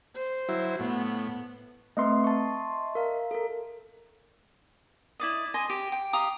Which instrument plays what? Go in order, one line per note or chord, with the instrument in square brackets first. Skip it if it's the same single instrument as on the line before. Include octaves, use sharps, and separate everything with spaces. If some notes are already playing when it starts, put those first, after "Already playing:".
[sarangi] C5
[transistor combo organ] F#3 E4
[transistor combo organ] A2 [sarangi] B3
[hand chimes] A3 C4 B4 [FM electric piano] D#5 E5 C6
[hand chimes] A5 C#6
A#4 F5
A4 A#4
[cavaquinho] E4 D5 D#5
D#5 G#5 C6
G4
G5
G4 F5 A#5 D#6